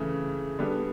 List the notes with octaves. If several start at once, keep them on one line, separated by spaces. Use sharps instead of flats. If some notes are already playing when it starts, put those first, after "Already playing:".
Already playing: C#3 E3 A3 E4
D3 G3 B3